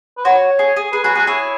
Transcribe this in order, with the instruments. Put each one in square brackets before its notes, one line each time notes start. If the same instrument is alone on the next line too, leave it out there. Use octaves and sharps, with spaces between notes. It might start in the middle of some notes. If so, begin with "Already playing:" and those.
[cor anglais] B4
[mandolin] F#4 [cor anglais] C#5
[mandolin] G#4
G#4
[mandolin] G#4 [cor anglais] B4
[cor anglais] F#4 [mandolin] G#4
[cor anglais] F#4 [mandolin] G#4
[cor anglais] E4 [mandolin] G#4 C#5